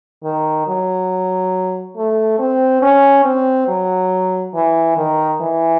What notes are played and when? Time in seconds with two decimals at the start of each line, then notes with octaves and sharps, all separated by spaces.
0.24 D#3
0.67 F#3
1.96 A3
2.39 C4
2.82 C#4
3.25 C4
3.68 F#3
4.54 E3
4.97 D#3
5.41 E3